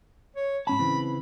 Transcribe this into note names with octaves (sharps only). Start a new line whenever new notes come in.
C#5
G#2 C#4 A5 B5
C#3 E3 C4